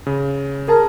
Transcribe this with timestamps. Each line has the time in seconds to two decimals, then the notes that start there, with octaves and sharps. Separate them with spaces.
0.07 C#3
0.68 G#4 A#4 A5 A#5